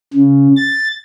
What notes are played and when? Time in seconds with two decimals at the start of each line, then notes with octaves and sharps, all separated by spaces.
0.13 C#3
0.56 A6